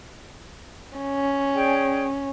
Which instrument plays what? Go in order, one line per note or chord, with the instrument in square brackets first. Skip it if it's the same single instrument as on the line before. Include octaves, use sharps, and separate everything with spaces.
[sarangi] C#4
[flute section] G#4 D5 G5